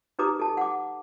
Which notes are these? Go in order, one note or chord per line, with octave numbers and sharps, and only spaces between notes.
D#4 G4 B4 A#5 D6 D#6
A4 A5
F#5 D6